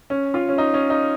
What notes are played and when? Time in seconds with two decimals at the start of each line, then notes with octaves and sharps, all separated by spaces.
0.10 C#4
0.34 F4
0.49 C#4
0.58 D#4
0.74 C#4
0.90 D#4